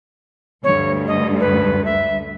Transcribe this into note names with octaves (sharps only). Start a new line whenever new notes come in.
D2 G2 C#5
D#5
B4
E5